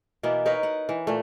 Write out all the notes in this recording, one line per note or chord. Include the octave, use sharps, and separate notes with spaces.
B2 E3 A#3 B3
D#4 A#4 B4 C#5
F#5
E3
A#2 A3